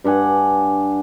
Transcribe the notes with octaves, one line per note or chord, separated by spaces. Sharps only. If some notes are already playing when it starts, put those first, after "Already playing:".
G2 D4 F#5 G#5